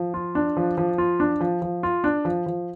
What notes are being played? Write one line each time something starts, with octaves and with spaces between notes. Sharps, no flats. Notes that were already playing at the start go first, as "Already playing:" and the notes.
Already playing: F3
F4
D4
F3
F3
F4
D4
F3
F3
F4
D4
F3
F3